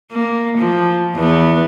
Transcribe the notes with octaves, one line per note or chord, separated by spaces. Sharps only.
A#3
F3
E2 B3